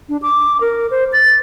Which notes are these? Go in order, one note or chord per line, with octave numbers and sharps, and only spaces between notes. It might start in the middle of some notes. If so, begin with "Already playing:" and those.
D4
D6
A#4
C5
A6